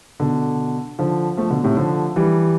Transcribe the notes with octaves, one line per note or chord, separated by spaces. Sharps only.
B2 D3
D3 F3
F3 A3
B2 D3
A2 C3
D3 F3
E3 G3